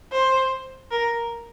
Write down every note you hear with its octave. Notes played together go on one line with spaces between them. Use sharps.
C5
A#4